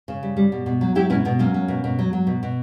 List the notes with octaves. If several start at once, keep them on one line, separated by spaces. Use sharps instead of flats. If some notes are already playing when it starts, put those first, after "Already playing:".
C#3
G3
G3
B2
B2
F#3
F#3 E4 G4
B2 C#4 E4
B2 B3
F#3 A#3 C#4
F#3
B2
B2
F#3
F#3
B2
B2